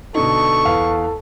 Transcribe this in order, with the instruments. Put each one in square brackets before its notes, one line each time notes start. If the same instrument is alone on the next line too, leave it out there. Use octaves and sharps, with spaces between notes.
[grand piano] B2 D3 D#4 [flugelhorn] A4 [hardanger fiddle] C#6
[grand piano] E2 B4 F5